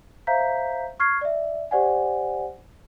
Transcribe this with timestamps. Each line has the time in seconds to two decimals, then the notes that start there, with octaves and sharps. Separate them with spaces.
0.27 C5 E5 F5 A#5 G6 B6
1.00 C#6 F6 G#6 C7
1.21 D5 E5
1.71 G4 C5 D5 F#5 G#5